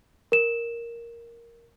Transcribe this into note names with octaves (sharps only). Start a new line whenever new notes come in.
A#4 E7